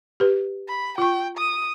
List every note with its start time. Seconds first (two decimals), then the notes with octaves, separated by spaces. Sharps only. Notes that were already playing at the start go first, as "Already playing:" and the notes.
0.20 G4 B4
0.68 B5
0.98 F4 G5 C#6
1.38 D#6